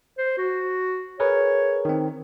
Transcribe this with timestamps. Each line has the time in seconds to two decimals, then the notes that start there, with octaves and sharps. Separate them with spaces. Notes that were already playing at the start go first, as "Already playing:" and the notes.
0.18 C5
0.38 F#4
1.20 G#4 A#4 B4 C#5
1.85 D#3 C4